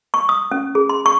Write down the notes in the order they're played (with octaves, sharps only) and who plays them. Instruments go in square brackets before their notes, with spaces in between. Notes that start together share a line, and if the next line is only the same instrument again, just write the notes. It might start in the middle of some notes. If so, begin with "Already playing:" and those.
[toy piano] C#6
D#6
C#4
G#4
C6
C#6